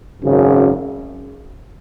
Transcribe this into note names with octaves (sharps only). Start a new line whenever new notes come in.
G#1 F#2 C#3